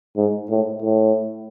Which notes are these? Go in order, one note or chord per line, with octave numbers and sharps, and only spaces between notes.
G#2
A2
A2